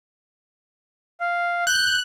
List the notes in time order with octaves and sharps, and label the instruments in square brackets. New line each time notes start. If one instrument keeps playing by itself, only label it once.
[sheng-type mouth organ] F5
[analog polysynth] F#6 [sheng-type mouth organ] G6